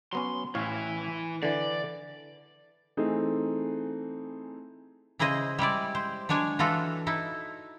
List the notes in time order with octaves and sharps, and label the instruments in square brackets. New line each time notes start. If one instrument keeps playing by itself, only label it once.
[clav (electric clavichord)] F#3 B3 C#4 [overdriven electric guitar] C6
[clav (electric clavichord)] A1 C#5 F5 [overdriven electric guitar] E3 E4
[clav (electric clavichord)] D3 E3 [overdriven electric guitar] D5
[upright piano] E3 A3 C4 D#4 G#4
[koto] C#3 E4 G#4 C5 D#5
G3 G#3 E4 D5
C5
F#3 G#3 D4 C#5 G#5
E3 F4 F#4 A4
D#4 E4 A4